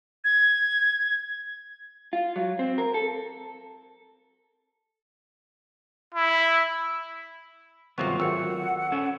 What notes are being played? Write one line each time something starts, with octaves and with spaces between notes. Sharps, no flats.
G#6
F4
F#3
C4
A#4
A4
E4
G1 C3 D#3 F#3 B3 F4 C#6
G#1 A3 F#5 E6 C#7
C#4 A4